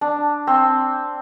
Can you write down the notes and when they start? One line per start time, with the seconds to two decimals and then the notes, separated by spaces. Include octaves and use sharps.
0.01 D4
0.47 C4